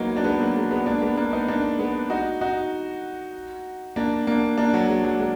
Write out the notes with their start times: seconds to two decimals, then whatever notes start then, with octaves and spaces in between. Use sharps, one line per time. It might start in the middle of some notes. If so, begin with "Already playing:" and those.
Already playing: F#3 A#3 B3 D#4
0.17 D4
0.24 G#3 B3
0.40 F#3 A#3
0.56 G#3
0.71 G#3 B3
0.86 A#3 D4
1.02 G#3 B3
1.17 A#3 D4
1.32 B3 D#4
1.48 A#3 D4
1.79 G#3 B3
2.10 D#4 F#4
2.41 D#4 F#4
3.96 A#3 D4
4.27 A#3 D4
4.58 A#3 D4
4.74 F#3
4.89 G#3
5.04 F#3
5.19 G#3